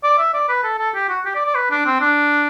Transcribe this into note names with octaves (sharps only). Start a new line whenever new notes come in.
D5
E5
D5
B4
A4
A4
G4
F#4
G4
D5
D5
B4
D4
C4
D4